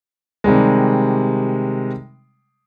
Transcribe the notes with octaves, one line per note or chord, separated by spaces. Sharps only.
C3 D#3 G3 G#3